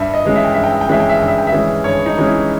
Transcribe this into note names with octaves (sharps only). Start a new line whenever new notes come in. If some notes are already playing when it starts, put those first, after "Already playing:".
Already playing: G2 E5
D#5
E3 G#3 C#4
E5
G5
G2 E5
G5
E5
G5
E3 G#3 C#4 E5
G5
E5
G2 G5
E5
G5
E5
E3 G#3 C#4
G2 C#5
D#4
E3 G#3 C#4
E4